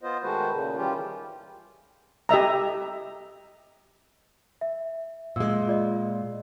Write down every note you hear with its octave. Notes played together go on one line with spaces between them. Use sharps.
B3 F4 C5 D#5
D#3 G#3 A3 F#4 B4 C5
A#2 C#3
D#3 E3 G3 C#4 F4 G4
G4 D#5 E5 A#5
E5
A#2 G#3 E6
F4 D5 D#5